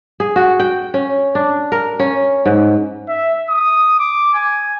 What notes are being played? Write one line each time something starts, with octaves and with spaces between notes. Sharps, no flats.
G#4
F#4
G5
C#4
D4
A#4
C#4
G#2
E5
D#6
D6
G#5